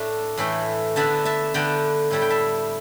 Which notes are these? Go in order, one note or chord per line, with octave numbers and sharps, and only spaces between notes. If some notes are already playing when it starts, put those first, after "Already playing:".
Already playing: A2 A3 D4 E4 E5
A2 E3 A3 E4 G5 B5
D3 B3 D4 E5 A5
E5 A5
D3 B3 D4 D5 G5
A2 G3 E4 A5
G5
E5 A5